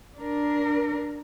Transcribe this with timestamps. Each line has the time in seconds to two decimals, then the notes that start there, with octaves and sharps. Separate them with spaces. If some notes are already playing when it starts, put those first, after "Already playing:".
0.18 D4 A#4